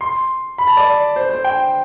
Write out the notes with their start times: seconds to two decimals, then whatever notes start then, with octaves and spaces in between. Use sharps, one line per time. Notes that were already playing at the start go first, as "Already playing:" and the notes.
0.01 C6
0.58 B5
0.67 A5
0.77 D5
1.16 C5
1.30 C5
1.44 G5